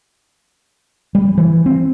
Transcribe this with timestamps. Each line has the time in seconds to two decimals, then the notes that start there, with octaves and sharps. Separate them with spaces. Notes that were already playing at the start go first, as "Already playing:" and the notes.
1.15 G3
1.38 E3
1.66 C4